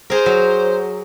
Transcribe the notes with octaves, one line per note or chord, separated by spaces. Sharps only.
G#4 A#4 C5
F#3